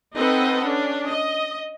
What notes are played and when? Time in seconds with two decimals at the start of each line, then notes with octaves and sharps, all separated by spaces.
0.14 C4 D#4 A4 B4 D#5 F#5
0.65 C#4 D4
1.08 D#5